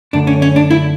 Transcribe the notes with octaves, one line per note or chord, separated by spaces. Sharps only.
F#2 D3 A3 D4
C#4
C#4
D4
E4